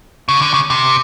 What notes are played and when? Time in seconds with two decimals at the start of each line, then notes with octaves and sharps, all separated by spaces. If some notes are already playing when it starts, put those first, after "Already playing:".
0.29 C#3
0.41 D3
0.54 C#3
0.70 C3